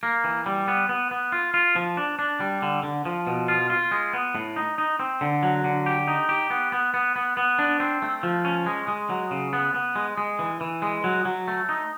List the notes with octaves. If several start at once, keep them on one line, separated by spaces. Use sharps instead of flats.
A#3
E3
G3
B3
B3
B3
F4
F4
F3
D4
D4
G3
D3
D3
F3
B2
F4
F4
G#3
B3
A2
D#4
D#4
C4
D3
F#3
D3
G4
D#4
G4
B3
B3
B3
B3
B3
D4
C4
A3
F3
C#4
G#3
G#3
F#3
C#3
B3
B3
G#3
G#3
E3
E3
G#3
F#3
F#3
A3
D#4